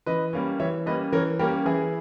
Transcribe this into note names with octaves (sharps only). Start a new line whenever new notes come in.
E3 B4 D#5
G3 A#3 C#4
E3 C#5 E5
G3 A#3 C#4 B4 D#5
E3 A#4 C#5
G3 A#3 C#4 G4 A#4
E3 E4 G#4